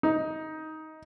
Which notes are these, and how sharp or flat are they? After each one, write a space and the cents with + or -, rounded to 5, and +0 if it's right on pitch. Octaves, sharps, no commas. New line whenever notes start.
D#4 +15